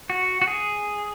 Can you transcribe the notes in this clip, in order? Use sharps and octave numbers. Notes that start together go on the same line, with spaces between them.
F#4
F#4
G#4